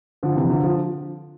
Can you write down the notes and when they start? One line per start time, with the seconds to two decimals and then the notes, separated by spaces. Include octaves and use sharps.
0.23 D3 F3
0.36 C3 E3
0.50 D3 F3
0.63 D3 F3